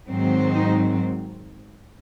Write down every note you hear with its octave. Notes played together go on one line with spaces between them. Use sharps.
G#2 D#3 F#3 C4
D#4